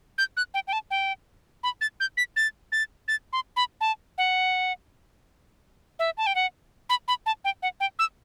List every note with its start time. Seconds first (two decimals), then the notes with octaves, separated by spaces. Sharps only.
0.18 G6
0.37 F#6
0.54 G5
0.68 G5
0.73 A5
0.91 G5
1.63 B5
1.81 A6
2.00 G6
2.17 B6
2.36 A6
2.72 A6
3.08 A6
3.33 C6
3.56 B5
3.81 A5
4.18 F#5
5.99 E5
6.18 A5
6.27 G5
6.35 F#5
6.90 B5
7.08 B5
7.26 A5
7.45 G5
7.62 F#5
7.80 G5
7.99 E6